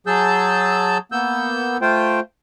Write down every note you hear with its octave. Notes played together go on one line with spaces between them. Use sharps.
F#3 G#4 A5 E6 G6
A#3 B3 E6 G6
A3 F4 C5 G5